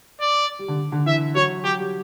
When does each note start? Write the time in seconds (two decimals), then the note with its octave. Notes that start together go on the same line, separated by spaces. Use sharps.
0.21 D5
0.59 G3
0.68 D3
0.92 D3
1.06 E3 E5
1.35 F#3 C#5
1.64 F#3 G4
1.78 G3